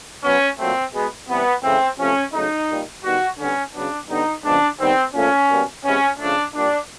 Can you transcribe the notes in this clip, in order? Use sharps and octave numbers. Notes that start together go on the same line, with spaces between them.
B2 F#3 B3 C#4
A#2 F#3 A3 C4
B2 G#3 B3
C3 E3 G3 B3
C#3 E3 A3 C4
C3 F3 A3 C#4
C#3 F#3 A3 D#4
A#2 G3 A#3
D#3 G3 B3 F#4
D3 G3 B3 C#4
C#3 F#3 B3 D4
D3 G3 B3 D#4
C#3 F3 G#3 B3 D4
D#3 G3 B3 C4
A#2 F3 A3 C#4
B2 G3 A#3
C3 E3 G#3 B3 C#4
C#3 F3 A3 D4
A#2 G3 A#3 D4